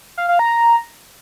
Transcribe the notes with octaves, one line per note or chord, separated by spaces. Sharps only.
F5
F5
A#5